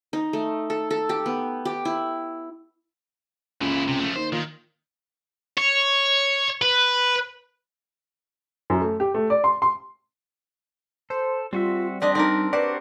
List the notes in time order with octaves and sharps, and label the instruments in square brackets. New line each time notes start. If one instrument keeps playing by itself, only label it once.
[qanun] D#4
A3
A4
A4
G4
B3
G4
E4
[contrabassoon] C#2 [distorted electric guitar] A#2 E4
[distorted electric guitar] C3
F3 A3
[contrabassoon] D#2 [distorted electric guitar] C5
[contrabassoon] A#2 [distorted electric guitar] D#3
[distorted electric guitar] C#5
B4
[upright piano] F#2
A3
G4
A3
D5
C6
C6
[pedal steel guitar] A4 [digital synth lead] C5
[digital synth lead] G3 [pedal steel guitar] C4 F#4 E5 [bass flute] F4
[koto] C4 D4 D#5 [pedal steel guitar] G4 [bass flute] D5
[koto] C4 D4 A#4 [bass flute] D#4
[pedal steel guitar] F#4 C5 [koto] G4 [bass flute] B4 [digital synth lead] D5